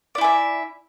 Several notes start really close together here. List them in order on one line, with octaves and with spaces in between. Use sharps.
D5 E4 G#5 E5